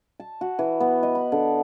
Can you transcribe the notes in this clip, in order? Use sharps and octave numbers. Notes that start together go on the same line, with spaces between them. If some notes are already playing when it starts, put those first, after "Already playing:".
A5
F#4
E3
B3
D#5
B5
D3